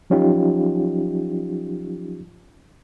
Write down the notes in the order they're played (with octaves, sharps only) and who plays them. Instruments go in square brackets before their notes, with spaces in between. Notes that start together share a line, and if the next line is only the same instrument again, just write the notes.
[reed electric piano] F3 F#3 C#4 D#4 F4 G4